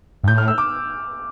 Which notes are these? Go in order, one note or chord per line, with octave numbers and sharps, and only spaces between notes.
G2
A2 G6
F6
E6
D6